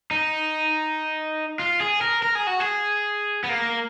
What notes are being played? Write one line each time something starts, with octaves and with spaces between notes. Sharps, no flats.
D#4
F4
G#4
A#4
A#4
G#4
F#4
G#4
B3
A#3